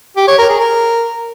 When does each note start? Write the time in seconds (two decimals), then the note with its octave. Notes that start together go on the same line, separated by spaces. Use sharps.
0.17 G4
0.28 C#5
0.39 A#4
0.49 G#4
0.60 A#4